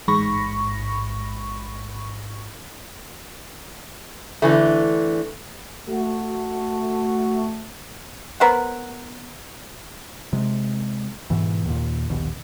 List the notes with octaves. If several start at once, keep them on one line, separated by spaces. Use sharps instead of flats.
A1 G#2 B5 C#6 A#6
D3 E3 A3
A3 F#4
B3 A#4 C5 F#5
C3 G#3
G#2 B2 E3
D#2 A#2
A#1 D#2 B2